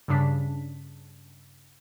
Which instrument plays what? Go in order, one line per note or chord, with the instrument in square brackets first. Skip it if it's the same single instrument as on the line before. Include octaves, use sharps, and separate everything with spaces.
[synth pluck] G2 C#3 D4 B6